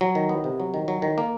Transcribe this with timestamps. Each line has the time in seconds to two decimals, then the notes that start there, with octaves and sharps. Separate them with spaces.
0.01 F#3
0.15 D#3
0.29 B3
0.44 C3
0.60 F#3
0.74 D#3
0.88 F#3
1.02 D#3
1.18 A#3